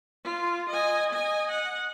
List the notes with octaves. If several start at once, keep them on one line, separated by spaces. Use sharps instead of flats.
F4
D#5 G#5
D#5 G#5
F#5